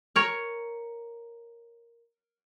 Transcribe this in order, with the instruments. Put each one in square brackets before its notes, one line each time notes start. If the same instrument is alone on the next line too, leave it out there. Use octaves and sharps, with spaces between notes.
[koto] A#4 C#5